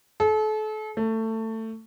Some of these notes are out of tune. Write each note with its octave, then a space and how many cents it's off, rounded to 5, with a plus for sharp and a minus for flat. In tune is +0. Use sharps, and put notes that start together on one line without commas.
A4 -35
A3 +20